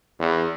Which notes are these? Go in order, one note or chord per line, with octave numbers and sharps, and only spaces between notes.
E2